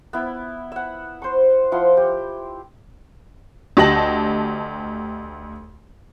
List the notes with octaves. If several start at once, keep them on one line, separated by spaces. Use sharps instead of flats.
B3 E4
E5 F#5
C5 C6 C#6
F3 E4 F#5 C6
G4
D2 G4 D#5 A5 A#6 F#7